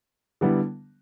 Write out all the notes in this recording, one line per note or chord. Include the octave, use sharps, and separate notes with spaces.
D3 G3 B3 E4